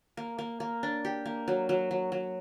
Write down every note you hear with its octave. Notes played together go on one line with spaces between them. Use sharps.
A#3
A#3
A#3
D4
G4
A#3
F#3
F#3
F#3
F#3